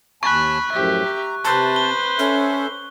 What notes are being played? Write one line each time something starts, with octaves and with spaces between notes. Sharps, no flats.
D#2 G#5 A5 B5 C#6 F#6
F#2 A2 F3 G4 E5
A#5
C3 B4 C5 A5
G7
C#4 A4 E5